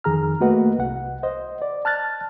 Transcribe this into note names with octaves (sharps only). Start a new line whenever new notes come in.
F2 D#3 G#4 A#5 F6
A3 A#3 F#4 B4 D#5 F#5
C2 F#5
C5 D#5
D5
A5 F6 F#6 A6